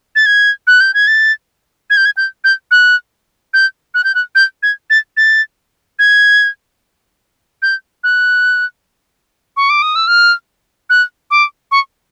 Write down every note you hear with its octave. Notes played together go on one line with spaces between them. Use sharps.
A6
G#6
F#6
G6
G#6
A6
G#6
G6
G#6
G6
G6
F#6
G6
F#6
G6
F#6
G6
G#6
A6
A6
G#6
G6
F#6
C#6
D6
D#6
E6
F6
F#6
D6
C#6